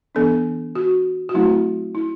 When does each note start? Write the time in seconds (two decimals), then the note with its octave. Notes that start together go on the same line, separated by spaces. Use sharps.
0.15 E3 B3 D4 A4
0.75 F#4
1.29 F#4
1.34 F#3 A3 C4 E4
1.95 E4